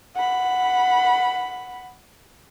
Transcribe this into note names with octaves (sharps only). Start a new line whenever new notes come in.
F#5 B5